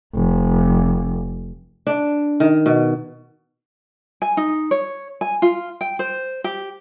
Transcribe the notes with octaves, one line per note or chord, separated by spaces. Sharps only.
F1
D4
D#3
B2
G#5
D#4
C#5
G#5
F4
G5
C5
G4